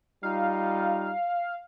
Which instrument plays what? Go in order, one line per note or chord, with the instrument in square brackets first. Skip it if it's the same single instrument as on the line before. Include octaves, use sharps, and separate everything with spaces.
[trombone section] G3 D#4 F4 [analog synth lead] F5